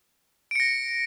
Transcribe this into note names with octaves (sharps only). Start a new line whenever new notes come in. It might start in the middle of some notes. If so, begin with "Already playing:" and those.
A#6 C#7 D7